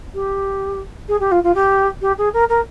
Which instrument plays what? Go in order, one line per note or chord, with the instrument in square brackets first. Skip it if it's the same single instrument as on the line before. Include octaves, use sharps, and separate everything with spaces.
[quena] G4
G#4
G4
F4
F4
G4
G4
G#4
A#4
A#4